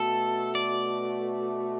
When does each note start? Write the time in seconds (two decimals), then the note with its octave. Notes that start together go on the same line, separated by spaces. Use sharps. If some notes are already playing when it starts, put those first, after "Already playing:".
Already playing: B2 A3 F#4 A4
0.55 D5